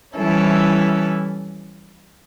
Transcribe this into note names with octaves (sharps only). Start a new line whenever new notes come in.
E3 G3 C#4 E4 A4